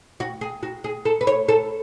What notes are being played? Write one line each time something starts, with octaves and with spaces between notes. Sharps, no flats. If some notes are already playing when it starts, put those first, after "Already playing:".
F#4
G#4
F#4
G#4
A4
B4
C#5
A4